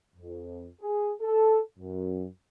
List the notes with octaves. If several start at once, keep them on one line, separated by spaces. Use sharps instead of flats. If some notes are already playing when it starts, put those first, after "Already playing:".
F2
G#4
A4
F#2